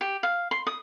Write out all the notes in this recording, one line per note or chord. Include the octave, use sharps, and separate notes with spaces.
G4
F5
C6
D#6